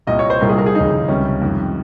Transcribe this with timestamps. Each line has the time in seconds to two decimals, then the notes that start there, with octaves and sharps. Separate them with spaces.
0.07 C2 A#2 G3 D#5
0.19 C#5
0.30 C5
0.41 C2 A#2 G3 A#4
0.49 G#4
0.58 A#4
0.66 G#4
0.75 D#2 C#3 F3 D#4
1.08 C#2 C3 G3 C#4
1.42 F2 D#3 G3